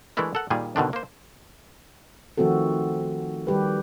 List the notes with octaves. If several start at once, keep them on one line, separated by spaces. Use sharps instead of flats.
E3 G#3 A3 D4 E4 A#4
A4 A#4 F#5
A#2 D#3 G3 G#4 G#5
B2 D3 D#3 D4
A#3 C5
D#3 F3 A3 C4 F#4 A4
D#3 G3 G4 B4